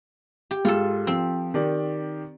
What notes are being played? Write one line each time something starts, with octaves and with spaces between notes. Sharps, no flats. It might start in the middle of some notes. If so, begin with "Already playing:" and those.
G4
G#2 F4 A4
F3 C4
D#3 G4 D5